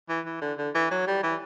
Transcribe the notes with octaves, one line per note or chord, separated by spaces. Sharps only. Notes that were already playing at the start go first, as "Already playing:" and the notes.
E3
E3
D3
D3
E3
F#3
G3
E3